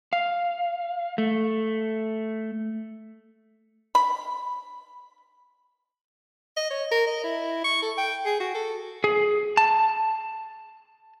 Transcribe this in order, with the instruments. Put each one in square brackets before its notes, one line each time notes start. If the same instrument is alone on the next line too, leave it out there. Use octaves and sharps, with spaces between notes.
[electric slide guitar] F5
A3
[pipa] B5
[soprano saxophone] D#5
C#5
A#4
D#5
E4
C#6
A4
G5
G#4
F#4
A4
[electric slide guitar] G#4
A5